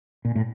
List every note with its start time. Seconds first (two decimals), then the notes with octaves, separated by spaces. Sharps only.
0.25 A#2
0.35 A2